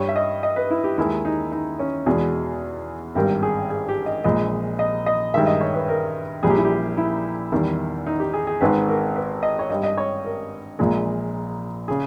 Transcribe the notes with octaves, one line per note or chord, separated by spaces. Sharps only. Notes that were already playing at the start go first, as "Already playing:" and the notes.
Already playing: G2 G3 C#5
E5
D#5
D#5
B4
E4
G4
D#2 D#3 G#3 E4
D#4
D#4
C#4
E2 B2 G#3 G#4
G#1 G2 G3 A#4
G#4
G#4
G4
D#5
A#1 A#2 G#3 D#5
D#5
D#5
G2 D#3 G#3 E5
D#5
C#5
B4
A#4
A#1 A#2 G3 G#4
G4
E4
G4
E4
E2 D#3 G3
D#4
G4
G#4
G#4
G#1 G#2 D#3 G#3 B4
A#4
B4
D#5
C#5
G2 G3 D#5
D#5
C#5
A#4
A#1 A#2 G#3
C#3 G#4